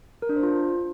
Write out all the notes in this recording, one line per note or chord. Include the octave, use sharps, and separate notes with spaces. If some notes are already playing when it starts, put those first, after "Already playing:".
A#4
D4
C5
F4